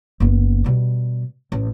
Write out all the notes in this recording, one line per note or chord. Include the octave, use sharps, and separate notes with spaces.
F#1 B3
B2 G3
A1